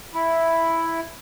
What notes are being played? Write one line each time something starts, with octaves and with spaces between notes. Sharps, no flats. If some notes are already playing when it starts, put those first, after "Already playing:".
E4